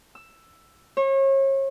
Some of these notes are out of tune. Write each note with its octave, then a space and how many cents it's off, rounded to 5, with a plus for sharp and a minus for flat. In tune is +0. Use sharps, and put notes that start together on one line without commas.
E6 +10
C#5 -35